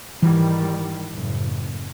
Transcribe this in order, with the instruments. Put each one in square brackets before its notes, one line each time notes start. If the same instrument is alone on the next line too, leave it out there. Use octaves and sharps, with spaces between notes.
[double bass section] G#2 D#3 G3 [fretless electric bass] E3
[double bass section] F#1 A2